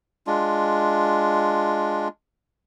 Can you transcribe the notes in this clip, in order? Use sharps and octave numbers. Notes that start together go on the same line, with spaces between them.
G#3 D4 F4